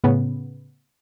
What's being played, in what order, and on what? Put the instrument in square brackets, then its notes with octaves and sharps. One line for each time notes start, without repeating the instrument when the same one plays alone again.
[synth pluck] A2 C#3 B3